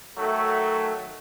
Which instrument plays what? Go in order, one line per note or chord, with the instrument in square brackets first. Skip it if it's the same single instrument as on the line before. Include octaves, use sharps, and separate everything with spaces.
[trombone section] D#3 F#3 A3